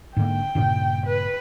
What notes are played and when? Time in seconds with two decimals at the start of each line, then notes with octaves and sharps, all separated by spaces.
0.17 G#2 D3 A#3 G5
0.55 G2 A#2 C#3
1.06 B4